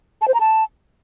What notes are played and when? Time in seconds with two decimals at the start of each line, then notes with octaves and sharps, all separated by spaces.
0.21 A5
0.28 C5
0.34 A#5
0.40 A5